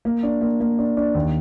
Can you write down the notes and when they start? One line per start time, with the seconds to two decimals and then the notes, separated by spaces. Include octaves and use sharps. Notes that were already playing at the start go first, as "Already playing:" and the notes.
0.05 A#3
0.23 D4
0.41 A#3
0.60 A#3
0.78 D4
0.97 D4
1.15 D#2